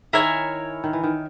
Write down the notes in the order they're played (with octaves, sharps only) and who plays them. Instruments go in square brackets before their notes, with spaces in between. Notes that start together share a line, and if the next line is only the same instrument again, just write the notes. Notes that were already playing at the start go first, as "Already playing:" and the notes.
[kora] D#3 [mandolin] E4 A#4 C#5 G#5
[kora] D#3
E3
D#3